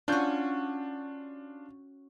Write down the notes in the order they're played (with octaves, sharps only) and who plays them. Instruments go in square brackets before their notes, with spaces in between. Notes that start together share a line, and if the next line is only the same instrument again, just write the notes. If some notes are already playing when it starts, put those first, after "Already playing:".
[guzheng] C#4 F#4 [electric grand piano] D4 F4 G6